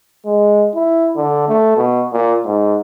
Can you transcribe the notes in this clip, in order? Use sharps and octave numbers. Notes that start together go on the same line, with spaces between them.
G#3
E4
D3
A3
B2
A#2
G#2